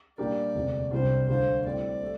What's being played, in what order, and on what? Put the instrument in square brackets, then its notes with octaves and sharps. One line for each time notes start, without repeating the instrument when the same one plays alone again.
[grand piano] A#2 G3 D4 G4 A#4 [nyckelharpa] D5
[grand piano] E1 D2 C3
[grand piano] C2 C3 G3 D4 [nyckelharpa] C5
[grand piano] D2 D3 G3 D4 F4 [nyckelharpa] C5
[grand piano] A2 G3 C4 [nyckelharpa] D5
[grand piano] A3